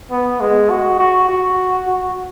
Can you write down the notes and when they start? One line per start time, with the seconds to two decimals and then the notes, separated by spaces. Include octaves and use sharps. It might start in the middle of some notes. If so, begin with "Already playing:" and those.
0.11 B3
0.41 G#3
0.70 F#4
0.99 F#4
1.29 F#4
1.87 F#4